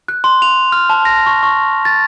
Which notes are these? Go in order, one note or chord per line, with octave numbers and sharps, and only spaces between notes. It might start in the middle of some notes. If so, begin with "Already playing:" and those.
F#6
C6
F7
F6
A5
A#6
C#6
C#6
A6